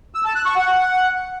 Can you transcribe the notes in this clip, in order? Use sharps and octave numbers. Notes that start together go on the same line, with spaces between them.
E6
A5
F#6
C#6
F#5